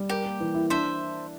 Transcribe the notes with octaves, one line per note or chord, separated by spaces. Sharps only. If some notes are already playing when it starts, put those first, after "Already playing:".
Already playing: G3
G4 A#4
A#3
E3
E4
D4 C5 E5